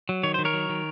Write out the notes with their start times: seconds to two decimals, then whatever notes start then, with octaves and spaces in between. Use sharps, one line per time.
0.09 F#3
0.23 D#3 C#5
0.34 D#3 C5
0.45 A#4 C#5
0.54 F#3
0.69 D#3